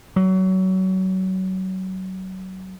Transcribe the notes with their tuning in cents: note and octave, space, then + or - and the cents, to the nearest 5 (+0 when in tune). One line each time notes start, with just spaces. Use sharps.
F#3 +25